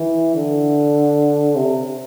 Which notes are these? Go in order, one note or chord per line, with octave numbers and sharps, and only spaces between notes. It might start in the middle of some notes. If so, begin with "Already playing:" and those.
Already playing: E3
D3
C3